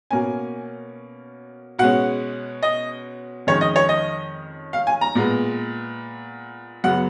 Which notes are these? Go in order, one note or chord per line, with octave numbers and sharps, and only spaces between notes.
B2 A#3 C#4 G#5
B2 G#3 C#4 F#5
D#5
F2 D#3 G#3 C#4 C#5
D#5
C#5
D#5
F5
G#5
A#5
A#2 G#3 B3
F#2 C#3 F#3 B3 F#5